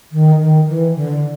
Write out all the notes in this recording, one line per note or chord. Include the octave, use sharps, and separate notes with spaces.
D#3
D#3
E3
D3